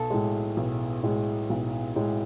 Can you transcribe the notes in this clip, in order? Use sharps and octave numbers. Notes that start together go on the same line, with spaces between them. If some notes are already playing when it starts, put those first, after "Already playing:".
Already playing: B1 A4
A2 G#3
B1
A2 G#3
B1
A2 G#3